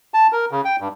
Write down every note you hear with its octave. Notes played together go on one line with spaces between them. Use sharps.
A5
A#4
C#3
G5
G2